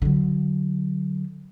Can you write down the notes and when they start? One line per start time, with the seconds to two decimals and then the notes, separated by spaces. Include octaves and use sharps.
0.02 D3 F#3